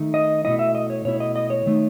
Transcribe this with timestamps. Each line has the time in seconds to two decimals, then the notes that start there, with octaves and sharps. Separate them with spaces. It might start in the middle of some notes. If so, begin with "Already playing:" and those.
Already playing: D#3 A3 D#4
0.14 D#5
0.44 B2 A3 E4 D#5
0.59 E5
0.75 D#5
0.90 C#5
1.05 B2 A3 E4 C#5
1.20 D#5
1.36 D#5
1.50 C#5
1.66 D#3 A3 D#4